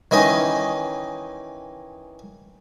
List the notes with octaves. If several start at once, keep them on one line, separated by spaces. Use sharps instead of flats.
D#3 E3 C#4 D#4 D#5